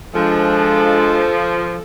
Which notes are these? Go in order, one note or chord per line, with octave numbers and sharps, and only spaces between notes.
F3 G#3 D4 A4